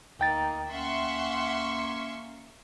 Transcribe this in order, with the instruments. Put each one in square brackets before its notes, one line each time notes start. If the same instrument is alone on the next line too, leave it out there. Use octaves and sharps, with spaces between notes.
[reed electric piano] D2 G5 A6 [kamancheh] A#3 D#4
[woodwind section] A#3 C#4 [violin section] E5 C6 C#6 [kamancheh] F#5